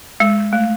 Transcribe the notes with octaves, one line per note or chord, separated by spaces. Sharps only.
G#3
A3